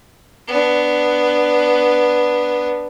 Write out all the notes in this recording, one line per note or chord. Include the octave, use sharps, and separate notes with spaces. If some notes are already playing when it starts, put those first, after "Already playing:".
B3 D4